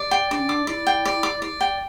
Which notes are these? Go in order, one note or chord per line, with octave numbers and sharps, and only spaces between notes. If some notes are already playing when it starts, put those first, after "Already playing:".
Already playing: D5
G5
D4 D5
C#4
D4 D6
E4 D5
G5
D5
D6
D5
G5